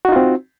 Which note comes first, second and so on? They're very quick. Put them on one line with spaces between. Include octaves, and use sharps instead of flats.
F#4 D#4 F4 C4